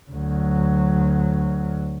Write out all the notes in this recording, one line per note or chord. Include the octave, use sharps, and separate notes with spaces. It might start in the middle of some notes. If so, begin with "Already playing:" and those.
D2 F#3